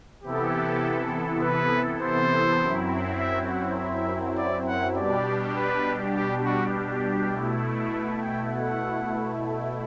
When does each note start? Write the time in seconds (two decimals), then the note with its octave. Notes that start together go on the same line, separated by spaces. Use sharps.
0.23 C3 E3 B3 E4 G4 A4
1.42 B4
2.01 C5
2.60 F#2 F#3 C4 E4
3.19 E5
3.49 F#5
3.79 E5
4.38 D5
4.68 F#5
4.97 B2 G3 D4 G4 D5
5.56 B4
6.15 G4
6.45 F#4
6.75 G4
7.34 B2 A3 E4
7.93 B4
8.22 G5
8.52 F#5